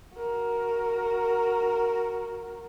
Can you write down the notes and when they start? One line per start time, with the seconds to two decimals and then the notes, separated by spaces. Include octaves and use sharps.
0.16 F#4 A#4